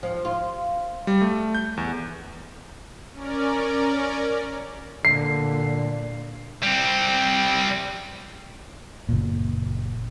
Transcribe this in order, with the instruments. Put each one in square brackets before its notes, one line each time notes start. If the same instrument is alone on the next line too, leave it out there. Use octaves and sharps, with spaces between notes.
[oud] F3
F4
[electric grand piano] G3
A3
G6
E2
[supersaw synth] C#4 A#4 D5
[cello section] A#2 [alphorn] D3 [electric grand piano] C7
[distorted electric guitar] G3 C4
[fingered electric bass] F#1 A#2